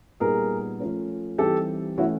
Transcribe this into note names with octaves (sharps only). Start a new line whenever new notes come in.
A#2 G3 B3 D#4 G#4 A#4
F3 A3 C#4
E3 G3 C4 D#4 G4 A4
E3 A3 C#4 E4 F#4